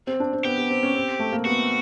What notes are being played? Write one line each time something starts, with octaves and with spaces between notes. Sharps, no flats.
C4
D4
C4
B3 G4
B3
C4
C#4
C4
A3
A#3
B3 F#4